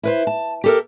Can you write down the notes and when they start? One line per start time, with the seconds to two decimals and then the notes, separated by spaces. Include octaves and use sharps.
0.03 E4 B4 C5
0.27 A5
0.64 G4 A4 A#4